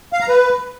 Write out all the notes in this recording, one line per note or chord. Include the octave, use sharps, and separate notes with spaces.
F5
A#5
B4